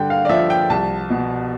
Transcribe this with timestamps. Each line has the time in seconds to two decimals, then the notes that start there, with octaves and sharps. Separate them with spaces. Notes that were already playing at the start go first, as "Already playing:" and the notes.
Already playing: G2 D3 G5
0.10 F5
0.25 D5
0.29 F3 E5
0.50 G5
0.70 C2 A5
1.10 B2